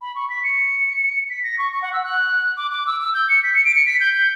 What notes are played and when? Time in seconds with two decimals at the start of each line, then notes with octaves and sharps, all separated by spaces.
0.02 B5
0.15 C#6
0.30 B6
0.44 C#7
1.30 B6
1.43 A#6
1.58 C#6
1.73 C#6
1.82 F#5
1.93 E6
2.04 F#6
2.57 D6
2.71 D6
2.87 E6
3.01 E6
3.14 G6
3.29 C#7
3.43 B6
3.54 C#7
3.65 D7
3.75 C#7
3.86 B6
4.00 G6
4.14 G6